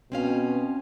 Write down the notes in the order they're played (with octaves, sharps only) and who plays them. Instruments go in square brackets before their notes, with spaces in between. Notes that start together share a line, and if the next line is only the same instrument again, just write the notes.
[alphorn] B2 [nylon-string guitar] C4 C#4 F5